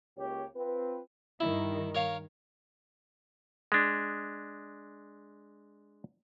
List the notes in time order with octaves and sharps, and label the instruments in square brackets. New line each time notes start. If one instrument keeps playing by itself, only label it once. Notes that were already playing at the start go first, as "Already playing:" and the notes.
[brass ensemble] C#2 A#3 G4 C#5
C4 F4 B4
[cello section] G2 D#3 [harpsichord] E4
[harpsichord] A#4 C#5 F5
[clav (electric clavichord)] G#3 D4